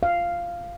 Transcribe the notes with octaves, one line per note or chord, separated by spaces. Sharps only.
F5